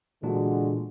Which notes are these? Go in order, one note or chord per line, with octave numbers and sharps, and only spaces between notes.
A#2 D3 E3 G#3 D4 F#4